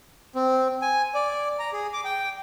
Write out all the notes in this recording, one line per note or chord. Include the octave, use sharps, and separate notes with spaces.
C4
G#5
D5
A#5
G#4
D6
G5